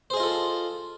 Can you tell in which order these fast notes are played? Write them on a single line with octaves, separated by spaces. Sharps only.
C5 G#4 D#5 F4 A4